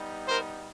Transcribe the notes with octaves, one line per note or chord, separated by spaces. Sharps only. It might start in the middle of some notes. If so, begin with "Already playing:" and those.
Already playing: G3 B3 D#4
A#4 C5